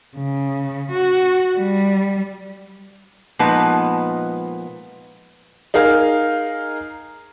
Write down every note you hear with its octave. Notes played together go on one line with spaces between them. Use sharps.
C#3
F#4
G3
A#2 F3 G#3 B3 D#4 B4
D#4 G#4 A#4 F5